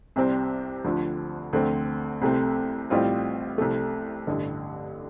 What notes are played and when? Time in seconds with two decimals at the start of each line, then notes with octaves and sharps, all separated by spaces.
0.16 C2 C3 G3 C4
0.84 D2 D3 F3
1.53 D2 D3 A3 C4
2.21 C2 C3 A3 C4
2.90 A1 A2 G3 C4 F4
3.58 C2 C3 A3
4.27 A1 G2 D3